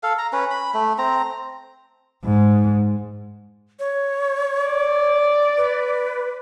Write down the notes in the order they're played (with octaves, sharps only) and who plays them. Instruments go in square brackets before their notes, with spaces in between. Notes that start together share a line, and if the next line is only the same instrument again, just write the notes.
[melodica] A4 F5
A#5
C#4 B4
B5
A3
C4 A#5
[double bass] G#2
[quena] C#5
[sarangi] D5
[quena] B4